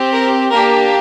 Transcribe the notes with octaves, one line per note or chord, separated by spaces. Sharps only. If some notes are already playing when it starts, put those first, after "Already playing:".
Already playing: C4 G4
A#4
A#3 D4 G4 A#4